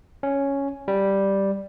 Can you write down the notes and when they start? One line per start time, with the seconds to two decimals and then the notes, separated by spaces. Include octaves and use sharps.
0.23 C#4
0.88 G3